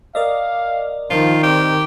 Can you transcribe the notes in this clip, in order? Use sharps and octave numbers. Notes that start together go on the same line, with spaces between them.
A#4 D5 D#5 F5
D#3 F3 F4
C4 G4